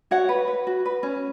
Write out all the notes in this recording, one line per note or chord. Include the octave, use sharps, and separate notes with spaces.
F#4 C#5 F#5
B4
B4
F#4
B4
C#4